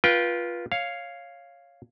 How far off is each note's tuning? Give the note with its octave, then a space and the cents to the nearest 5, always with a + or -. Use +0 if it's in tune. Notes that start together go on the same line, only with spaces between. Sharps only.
F4 +0 B4 -25 G5 +0
C#5 +0 F5 +0